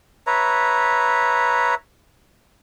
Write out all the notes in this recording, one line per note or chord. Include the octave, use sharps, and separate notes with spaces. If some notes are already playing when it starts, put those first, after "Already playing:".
B4 C#5 E5 A#5